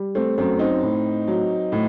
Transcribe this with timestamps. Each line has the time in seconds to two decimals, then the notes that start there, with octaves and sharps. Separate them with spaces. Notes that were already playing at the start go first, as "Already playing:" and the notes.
Already playing: G3
0.15 A3 C4
0.38 F#2 A3 C4
0.59 C4 D#4
0.82 A2
1.28 F#3
1.72 A2